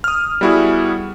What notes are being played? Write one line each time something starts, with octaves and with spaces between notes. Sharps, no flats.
D#6 F6
G3 B3 E4 F#4 G#4